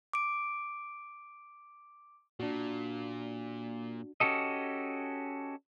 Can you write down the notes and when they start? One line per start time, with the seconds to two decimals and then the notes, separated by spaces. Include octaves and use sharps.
0.13 D6 D7
2.39 A#2 D4 F#4
4.20 C#4 F#4 G4 A4 D#5